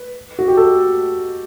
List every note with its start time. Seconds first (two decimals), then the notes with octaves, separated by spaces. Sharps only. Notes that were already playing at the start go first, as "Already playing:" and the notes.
Already playing: B4
0.39 F#4
0.48 G4
0.57 A4